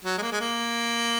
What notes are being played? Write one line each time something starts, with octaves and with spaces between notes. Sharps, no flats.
F#3
G#3
A#3
G#3
A#3